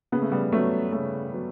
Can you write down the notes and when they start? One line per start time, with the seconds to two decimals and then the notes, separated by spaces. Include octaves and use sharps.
0.12 C#3 B3
0.22 A3
0.32 G3 B3
0.52 F#3 A3 B3 C#4
0.92 C#3 A3 C#4
1.32 F#3 B3